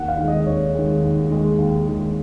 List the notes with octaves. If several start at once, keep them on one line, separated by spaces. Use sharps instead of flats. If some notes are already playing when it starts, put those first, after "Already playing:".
Already playing: D#2 F#5
F5
D#3 G#3
D#5
D#2 C#5
D#3 G#3
D#2
D#3 G#3
D#2
D#3 G#3